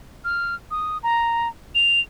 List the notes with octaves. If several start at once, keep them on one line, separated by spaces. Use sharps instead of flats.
F6
D#6
A#5
F7